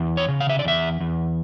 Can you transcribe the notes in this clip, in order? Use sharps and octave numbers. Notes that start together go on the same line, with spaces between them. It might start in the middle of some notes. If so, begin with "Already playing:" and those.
Already playing: E2
C#5
C#3
F5
E5
D5
E2 E5
E2